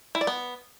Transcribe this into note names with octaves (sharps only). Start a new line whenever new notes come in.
E4
D5
B3